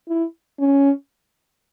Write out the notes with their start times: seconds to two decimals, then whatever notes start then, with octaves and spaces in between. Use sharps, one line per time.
0.08 E4
0.59 C#4